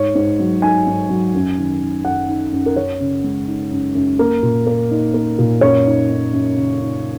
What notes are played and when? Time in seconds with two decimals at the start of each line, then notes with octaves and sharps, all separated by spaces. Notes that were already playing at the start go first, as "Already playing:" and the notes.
Already playing: G#2 C#5
0.15 G#2
0.39 F#3
0.62 D#4 G#5
0.87 G#2
1.10 F#3
1.34 F#2
1.58 D#3
1.81 D#3
2.05 F#2 F#5
2.29 D#4
2.52 F#2
2.66 A#4
2.76 F#2 C#5
3.00 C#3
3.24 G#3
3.47 D#4
3.71 F#2
3.95 F#2
4.19 A#3 A#4
4.43 A#2
4.67 A#3
4.91 D#4
5.14 A#3
5.38 A#2
5.61 F#2 C#5
5.86 D#4
6.10 D#4
6.33 F#2
6.57 C#3
6.81 D#4